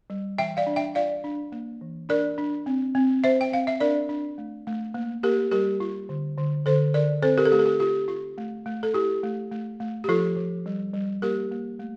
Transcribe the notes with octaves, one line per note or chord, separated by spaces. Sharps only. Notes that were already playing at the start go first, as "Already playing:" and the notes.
G3
E3 E5 G5
D5 F5
D4
E5 G5
F4 D5 F5
D4
A#3
E3
D4 A#4 D5
D4
C4
C4
C4 C5 E5
G5
C4 F5
E5
D4 A#4 D5
D4
A3
A3
A#3
A#3 G4 A#4
G3 G4 A#4
F4
D3
D3
D3 A4 C5
D3 A#4 D5
C4 A4 C5
G4 A#4
A4
A3 G4
A4
G4
F4 G4
F4
A3
A3
A4
E4 G4
A3
A3
A3
G4
F3 F4 A4
F3
G3
G3
A#3 G4 A#4
A#3
A3